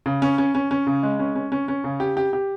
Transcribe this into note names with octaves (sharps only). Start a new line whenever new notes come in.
C#3
C#4
C#4
C#4
C#4
C#3
G#3
C#4
C#4
C#4
C#4
C#3
G4
G4
G4